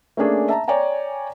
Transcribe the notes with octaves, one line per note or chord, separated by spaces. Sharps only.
A3 A#3 C#4 D4 G#4
E5 A5 A#5
C#5 D5 G5 G#5 A#5